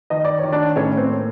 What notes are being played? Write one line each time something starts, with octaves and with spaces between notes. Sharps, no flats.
D#3 D#5
D5
C#5
D#3
D4 D5
A2 C#4 C#5
C4 C5
A#3